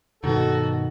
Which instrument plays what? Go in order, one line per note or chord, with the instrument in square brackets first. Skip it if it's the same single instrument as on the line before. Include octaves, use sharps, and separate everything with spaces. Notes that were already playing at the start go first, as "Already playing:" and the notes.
[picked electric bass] G2 B2 D#3 [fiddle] F#4 [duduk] A4